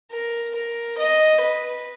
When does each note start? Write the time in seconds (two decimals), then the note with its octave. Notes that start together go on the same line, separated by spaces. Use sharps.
0.12 A#4
0.55 A#4
0.98 D#5
1.40 B4